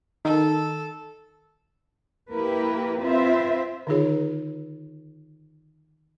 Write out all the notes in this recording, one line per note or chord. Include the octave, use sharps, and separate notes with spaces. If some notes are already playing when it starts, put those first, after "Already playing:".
D#3 A4
A#3 E4 G4 A#4 B4
C4 F4 B4 C5 E5
D3 D#3 D#4 F4 G#4 C#5